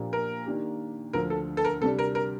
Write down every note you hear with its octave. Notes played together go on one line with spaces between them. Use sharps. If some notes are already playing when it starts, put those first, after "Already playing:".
Already playing: A#2 F3 A#3 D4 G4
A#4
D#3 A#3 D4 G4
D2 D3 F3 A#4
A4
A4
A#4
C3 G3 D4 A4
A#4
A#4